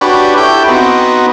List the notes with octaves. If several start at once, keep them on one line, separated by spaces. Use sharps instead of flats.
D4 F#4 G4 B4 C#5
E4 G4 A4 G5
B3 C4 D#4 F#4